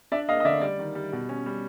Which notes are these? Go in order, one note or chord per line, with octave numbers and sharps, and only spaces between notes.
D4 D5 E5
A#3 D#5 F5
D#5
D3 D5 E5
G3 D5
D#3
G3
B2
C#4
G3